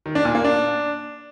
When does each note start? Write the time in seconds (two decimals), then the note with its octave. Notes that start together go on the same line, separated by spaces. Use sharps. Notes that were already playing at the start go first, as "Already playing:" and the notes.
0.06 D#3
0.15 D4
0.25 A#2
0.35 A#3
0.45 D4